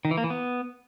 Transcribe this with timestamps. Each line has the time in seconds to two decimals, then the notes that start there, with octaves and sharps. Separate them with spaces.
0.05 D#3
0.11 E3
0.17 A#3
0.24 E3
0.30 B3